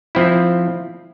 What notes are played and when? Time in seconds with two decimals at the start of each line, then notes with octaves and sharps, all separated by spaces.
0.15 F3 C4 E4